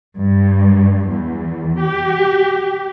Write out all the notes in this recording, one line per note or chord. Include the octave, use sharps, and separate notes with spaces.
G2
E2
G4